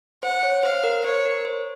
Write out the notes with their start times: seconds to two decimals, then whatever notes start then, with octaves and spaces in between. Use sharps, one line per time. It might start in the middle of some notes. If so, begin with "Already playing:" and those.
0.23 C5 F#5
0.43 C#5
0.63 C5 F5
0.84 A#4
1.04 C5 C#5
1.25 A#4
1.45 C5